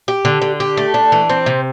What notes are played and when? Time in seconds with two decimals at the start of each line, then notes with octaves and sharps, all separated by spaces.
0.08 G4
0.25 D3
0.42 D3
0.60 G4
0.77 A3
0.94 D4
1.12 E3
1.30 C4
1.46 C3